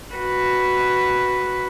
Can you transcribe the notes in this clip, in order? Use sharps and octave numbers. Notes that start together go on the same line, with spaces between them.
F#4 B4